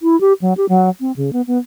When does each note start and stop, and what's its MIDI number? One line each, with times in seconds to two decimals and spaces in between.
0.02 0.19 64
0.21 0.33 67
0.42 0.54 54
0.57 0.68 67
0.69 0.90 54
1.01 1.12 60
1.16 1.33 49
1.33 1.42 59
1.47 1.58 59